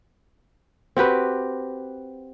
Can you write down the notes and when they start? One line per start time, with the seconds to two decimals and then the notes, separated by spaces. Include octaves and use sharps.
0.97 C4 F#4 G4 B4